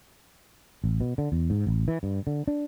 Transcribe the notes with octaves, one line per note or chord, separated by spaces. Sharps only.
A1
B2
D3
E2
G#2
A1
E3
G2
D3
D4